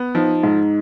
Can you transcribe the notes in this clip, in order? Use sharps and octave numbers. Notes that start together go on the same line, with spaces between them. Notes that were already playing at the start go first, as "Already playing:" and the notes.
Already playing: B3
F3 D#4
G#2 D#4